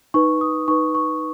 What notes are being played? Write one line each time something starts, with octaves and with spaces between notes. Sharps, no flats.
D#4 B4 C#6
D#6
D#4 B4 C#6
C#6